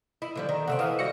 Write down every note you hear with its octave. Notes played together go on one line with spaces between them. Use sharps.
E4 D#5
D3 F3 G3
D#3
C3 A3 C4 C5 E5 F#5
E3 D#5 F5 D#6
G3 E4 F#4 A#6 C#7